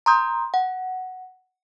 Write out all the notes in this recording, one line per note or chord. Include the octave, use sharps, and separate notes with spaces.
A#5 C6 D#6 G6
F#5